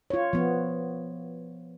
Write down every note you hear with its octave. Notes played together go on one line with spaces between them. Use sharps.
F4 C#5
F3 B3